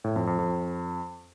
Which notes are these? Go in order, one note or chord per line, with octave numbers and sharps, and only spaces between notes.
A2
F2
F2
F2